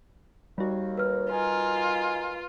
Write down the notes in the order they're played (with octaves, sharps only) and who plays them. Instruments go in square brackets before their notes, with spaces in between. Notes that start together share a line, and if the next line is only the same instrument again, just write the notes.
[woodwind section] D#2 [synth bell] G3 F#4
[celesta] B4 F6
[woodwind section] D#4 A#4 G#5 [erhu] F4